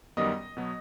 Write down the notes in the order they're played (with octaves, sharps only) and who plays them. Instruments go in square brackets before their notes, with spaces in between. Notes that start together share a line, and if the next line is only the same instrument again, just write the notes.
[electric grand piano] F#2 D#3 G3 B3 [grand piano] D#5 D#6
[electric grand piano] B2 F#3 B3